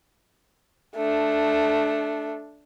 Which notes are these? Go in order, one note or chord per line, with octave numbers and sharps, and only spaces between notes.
A3 D4